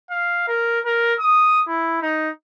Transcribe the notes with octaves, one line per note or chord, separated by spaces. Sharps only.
F5
A#4
A#4
D#6
E4
D#4